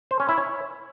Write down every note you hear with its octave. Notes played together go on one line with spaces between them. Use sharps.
C5
C#4
E4
C#5